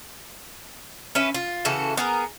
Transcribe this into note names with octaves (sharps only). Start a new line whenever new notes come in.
C#4 B4 E5
F4
C#3 E3 F#4 A4
B3 G#4 A#4